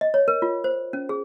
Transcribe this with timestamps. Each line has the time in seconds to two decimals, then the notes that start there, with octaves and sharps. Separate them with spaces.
0.01 D#5
0.14 C#5
0.28 A#4
0.42 F4
0.64 C5
0.93 C#4
1.09 G#4